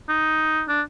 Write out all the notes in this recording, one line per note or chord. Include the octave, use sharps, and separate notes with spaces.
D#4
D4